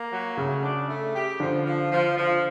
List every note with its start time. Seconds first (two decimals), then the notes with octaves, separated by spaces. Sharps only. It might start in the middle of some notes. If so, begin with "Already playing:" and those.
Already playing: A#3
0.12 F#3
0.37 C#3 A3
0.63 D4
0.88 A3
1.15 G4
1.40 D3 F3
1.65 F3
1.91 F3
2.17 F3